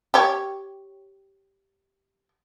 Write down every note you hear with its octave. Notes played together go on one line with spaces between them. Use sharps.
G4 C#5